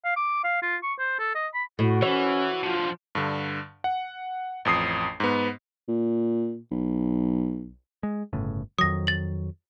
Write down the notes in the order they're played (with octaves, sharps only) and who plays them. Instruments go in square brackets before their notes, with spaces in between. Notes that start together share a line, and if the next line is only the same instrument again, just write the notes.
[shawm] F5
D6
F5
F4
C#6
C5
A4
D#5
B5
[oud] A2 [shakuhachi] F#4
[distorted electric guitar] E3 [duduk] C#4 [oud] C#5
[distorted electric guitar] D3 F3 [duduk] F4
[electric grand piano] G2 D3
F#5
A1 F2 D#6 C7
G#2 B3
[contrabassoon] A#2
B1
[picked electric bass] G#3
G1 A2 C#3
[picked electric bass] F2 D#3 F#3 [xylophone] D#6 A#6
[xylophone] A6 F#7